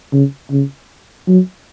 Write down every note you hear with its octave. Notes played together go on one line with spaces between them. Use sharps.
C#3
C#3
F#3